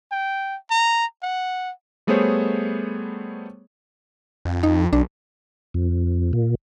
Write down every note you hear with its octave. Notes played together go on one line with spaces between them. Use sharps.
G5
A#5
F#5
G3 A3 B3 G#4 C5 C#5
F2
D#4
B1 D4
F2
A#2